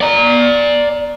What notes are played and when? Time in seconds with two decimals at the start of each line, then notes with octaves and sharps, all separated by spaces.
0.01 D5 A#5